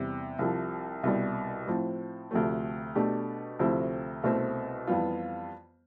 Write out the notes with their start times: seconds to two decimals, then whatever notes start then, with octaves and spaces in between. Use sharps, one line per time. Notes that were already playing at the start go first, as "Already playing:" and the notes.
Already playing: E2 C3 G3
0.39 C2 C3 F3
1.03 C2 B2 G3
1.67 A2 F3 C4
2.31 D2 C3 F3 A3
2.95 B2 A3 D4 G4
3.59 D2 C3 F3 C4 E4
4.24 C2 B2 A3 C4
4.87 F2 E3 G3 B3 F4